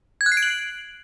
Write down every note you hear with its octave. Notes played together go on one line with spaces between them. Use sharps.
G#6
F#6
C7
D7
F#7